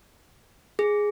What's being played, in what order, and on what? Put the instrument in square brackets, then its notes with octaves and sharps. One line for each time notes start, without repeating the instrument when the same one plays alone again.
[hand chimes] G#4